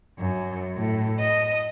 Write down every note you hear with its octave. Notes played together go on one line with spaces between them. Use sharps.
F#2
A2
D#5